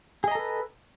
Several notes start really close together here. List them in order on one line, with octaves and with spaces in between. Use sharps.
G#4 D#5 A#5 A4 B4